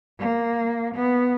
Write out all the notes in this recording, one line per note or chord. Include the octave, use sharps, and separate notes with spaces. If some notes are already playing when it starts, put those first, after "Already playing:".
A#3
B3